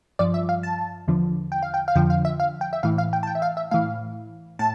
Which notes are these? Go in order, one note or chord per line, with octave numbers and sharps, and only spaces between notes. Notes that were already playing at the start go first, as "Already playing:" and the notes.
G2 F3 D5
E5
F5
A5
E2 D3 F3
G5
F5
G5
F5
F2 D3 F3 G5
F5
E5
F5
G5
E5
A2 E3 F5
F5
G5
A5
G5
E5
F5
E5
A2 E3 F5
A2 A5